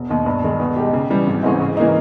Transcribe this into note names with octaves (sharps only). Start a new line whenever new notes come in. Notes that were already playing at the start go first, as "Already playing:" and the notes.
Already playing: E1
D#2 D#3
G2
D#3 G#3
B2
G#3 D#4 G4
C#3
E3 G3
G#1
G#2 E3 G#3 C#4
C#3
E3 A#3 D#4